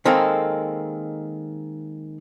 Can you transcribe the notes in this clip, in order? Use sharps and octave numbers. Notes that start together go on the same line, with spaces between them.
D#3 G#3 A#3 C4 A4